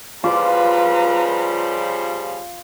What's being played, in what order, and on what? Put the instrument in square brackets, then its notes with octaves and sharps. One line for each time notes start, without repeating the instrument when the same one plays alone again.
[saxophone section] C#3 F3 G3 [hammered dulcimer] F4 D6 [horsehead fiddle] B4 A#5